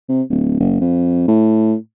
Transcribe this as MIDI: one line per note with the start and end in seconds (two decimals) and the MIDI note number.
0.09 0.22 48
0.30 0.57 26
0.60 0.76 30
0.81 1.26 41
1.28 1.75 45